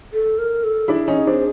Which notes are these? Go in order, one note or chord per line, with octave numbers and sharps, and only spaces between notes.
A4
A#4
A4
D4 E4 G#4
C#4 D#4
C4 D4